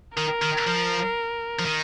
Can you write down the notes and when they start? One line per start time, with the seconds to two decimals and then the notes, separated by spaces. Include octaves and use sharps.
0.16 D#3 A#4
0.42 D#3
0.67 F3
1.59 F3
1.65 D#3